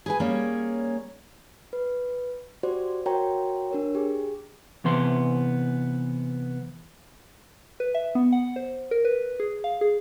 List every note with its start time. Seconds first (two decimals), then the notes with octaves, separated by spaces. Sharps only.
0.06 G#4 B4 G#5
0.20 G3 A#3 C#4 G#4 C#5 D5
1.73 B4
2.63 F#4 G4 C5 D5
3.06 F#4 A#4 C#5 G5 A#5
3.71 D4 A#4 C#5
3.95 G4 G#4
4.84 C3 E3 B3 C6
7.80 B4
7.95 E5
8.15 B3
8.32 F#5
8.56 C5
8.91 A#4
9.05 B4
9.40 G#4
9.64 F5
9.81 G#4